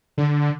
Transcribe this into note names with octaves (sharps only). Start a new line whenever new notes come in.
D3